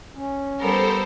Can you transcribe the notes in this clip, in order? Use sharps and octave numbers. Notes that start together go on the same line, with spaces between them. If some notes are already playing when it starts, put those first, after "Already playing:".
C#4
G3 B3 A4 A#4 C5